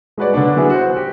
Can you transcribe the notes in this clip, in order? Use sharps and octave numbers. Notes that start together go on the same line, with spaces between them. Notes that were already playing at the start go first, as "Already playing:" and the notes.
G#3 F#4 B4 C#5 D5
D3 B3 D4
F#3 B3 E4 G#4
F#4 C5
G4